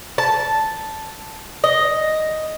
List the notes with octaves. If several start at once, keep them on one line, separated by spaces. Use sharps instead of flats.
A5
D#5